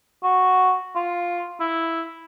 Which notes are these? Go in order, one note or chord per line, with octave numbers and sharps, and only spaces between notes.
F#4
F4
E4